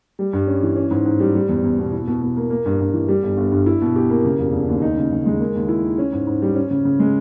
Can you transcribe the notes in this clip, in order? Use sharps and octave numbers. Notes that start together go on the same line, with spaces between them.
G3
G2
C#4
E3
C#4
G#2
G#2
G3
G3
E2
E2
B2
E4
B2
B2
A#3
A#3
G2
G2
E3
G3
G1
G1
G2
E4
B2
G4
A#3
C#3
E1
E1
D#2
D#4
C#3
C#3
G#3
A#3
D#2
E4
D#3
C#4
G#2
G#2
G3
C#4
C#3
C#3
G#3